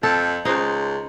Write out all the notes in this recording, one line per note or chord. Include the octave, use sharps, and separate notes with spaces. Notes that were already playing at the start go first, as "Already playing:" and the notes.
F2 A4
C#2 D#4 C5